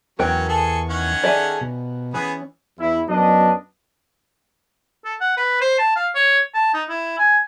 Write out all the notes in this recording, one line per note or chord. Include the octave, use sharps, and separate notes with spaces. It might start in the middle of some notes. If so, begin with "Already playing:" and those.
E2 F#3 B3 C#4 A#4 G5 C#6
G#4 A4
D#3 C#4 F#5
G#4 A4 D5 E5 G#5
B2
E3 B3 C#4 G#4 B4
E2 E4
F#2 B3 D4 D#5
A4
F#5
B4
C5
A5
F5
C#5
A5
D#4
E4
G#5